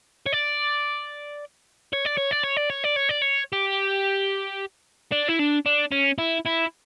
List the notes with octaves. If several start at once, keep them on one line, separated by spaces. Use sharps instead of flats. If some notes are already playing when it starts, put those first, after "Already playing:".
C#5
D5
C#5
D5
C#5
D5
C#5
D5
C#5
D5
C#5
D5
C#5
G4
D4
E4
D4
D4
C#4
E4
E4